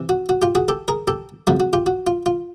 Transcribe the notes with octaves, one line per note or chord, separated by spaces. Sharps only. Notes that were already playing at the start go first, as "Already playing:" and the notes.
Already playing: C3 E3
F#4
F#4
F4 G4
F#4 G#4
G4 A4
G#4 A#4
G4 A4
F2 C#3 F3 A3 F#4
F#4
F4 G4
F#4
F4
F4